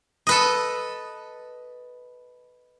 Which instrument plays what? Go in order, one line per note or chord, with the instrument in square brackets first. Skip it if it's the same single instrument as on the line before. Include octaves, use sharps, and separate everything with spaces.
[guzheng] A4 B4 D#5